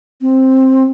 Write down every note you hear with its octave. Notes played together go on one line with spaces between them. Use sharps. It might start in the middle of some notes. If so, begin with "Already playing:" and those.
C4